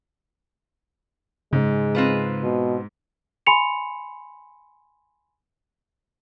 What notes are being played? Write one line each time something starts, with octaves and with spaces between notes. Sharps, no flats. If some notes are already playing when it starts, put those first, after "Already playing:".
G#2 C#3 G#3
C4 F4 B4
B2
G#5 B5 C6 C#7 F7